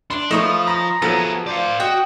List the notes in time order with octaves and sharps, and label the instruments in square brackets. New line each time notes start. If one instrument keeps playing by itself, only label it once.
[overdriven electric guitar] D4 [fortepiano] C6
[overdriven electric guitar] F3 [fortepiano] A3 D#4 [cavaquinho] B4 C#5 D#5
[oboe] A#5 [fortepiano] B5
[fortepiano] F3 F#3 [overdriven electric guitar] B3 G#4 [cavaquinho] A4
[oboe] C5 [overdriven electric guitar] D5 F5
[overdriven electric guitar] F#4 [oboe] D#5 [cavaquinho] G5